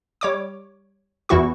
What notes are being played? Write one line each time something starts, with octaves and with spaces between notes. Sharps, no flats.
G3 C#5 D6
E2 E3 E4 F#4 C#6